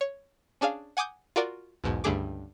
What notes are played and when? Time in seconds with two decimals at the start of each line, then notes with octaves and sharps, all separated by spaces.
0.01 C#5
0.61 C#4 D4 G#4 F5
0.97 F#5 G#5 D6 D#6 G6
1.36 F4 F#4 A#4 D5
1.84 B1 E2 G#2 B2
2.04 C#2 G2 D3 A3 G#4 D6